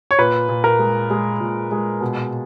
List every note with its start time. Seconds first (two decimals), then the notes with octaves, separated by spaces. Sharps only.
0.11 C#5
0.19 A#2 B4
0.49 A#2
0.64 A#4
0.79 G#3
1.10 G#3
1.40 A#2
1.72 G#3
2.01 B2